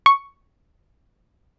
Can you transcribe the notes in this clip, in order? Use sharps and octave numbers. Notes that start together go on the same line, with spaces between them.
C#6